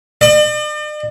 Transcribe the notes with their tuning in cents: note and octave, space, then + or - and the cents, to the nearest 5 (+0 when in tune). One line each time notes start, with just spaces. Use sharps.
D5 +45